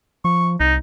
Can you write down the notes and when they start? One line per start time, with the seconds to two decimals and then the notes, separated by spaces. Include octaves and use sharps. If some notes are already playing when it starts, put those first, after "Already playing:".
0.25 F3 C#6
0.60 C2 D#4